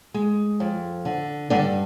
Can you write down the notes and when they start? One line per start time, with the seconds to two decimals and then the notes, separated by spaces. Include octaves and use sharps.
0.14 G#3
0.60 F2
1.05 D3
1.50 G2 D3 D4